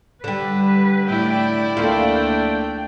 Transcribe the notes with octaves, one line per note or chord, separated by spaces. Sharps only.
D3 G3 B4
A2 E4 D5 G5
D2 A3 A#3 D4 F4 G5